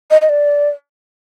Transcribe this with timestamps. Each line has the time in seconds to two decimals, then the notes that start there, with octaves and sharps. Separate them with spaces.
0.11 D#5
0.22 D#5
0.29 D5